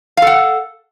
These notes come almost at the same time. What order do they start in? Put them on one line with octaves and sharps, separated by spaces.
F5 A4 F#5